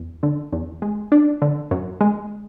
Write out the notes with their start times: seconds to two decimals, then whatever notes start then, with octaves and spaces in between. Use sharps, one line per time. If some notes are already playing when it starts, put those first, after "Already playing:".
Already playing: E2
0.23 D3
0.53 E2
0.82 G#3
1.12 D4
1.42 D3
1.71 F#2
2.01 G#3